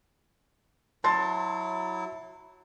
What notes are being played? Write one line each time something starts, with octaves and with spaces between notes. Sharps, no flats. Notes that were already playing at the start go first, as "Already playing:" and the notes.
F#3 E4 A5 C6 A6